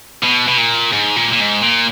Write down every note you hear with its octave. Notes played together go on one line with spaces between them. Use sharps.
B2
B2
A#2
G#2
A#2
A#2
G#2
A#2